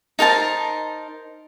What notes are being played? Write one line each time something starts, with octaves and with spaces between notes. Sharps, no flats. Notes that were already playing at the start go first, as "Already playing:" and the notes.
D#4 A#4 C5 A5